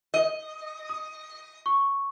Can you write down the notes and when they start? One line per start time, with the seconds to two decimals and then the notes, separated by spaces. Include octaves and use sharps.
0.14 D#5
0.89 D#6
1.66 C#6